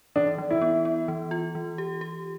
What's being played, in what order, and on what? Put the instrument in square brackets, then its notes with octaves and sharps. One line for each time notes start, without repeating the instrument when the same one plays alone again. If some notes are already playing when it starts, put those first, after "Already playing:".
[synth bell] E3 [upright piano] D4
[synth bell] E3
[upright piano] E4
[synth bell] B3
B3
E3
F4
E3
G4
G4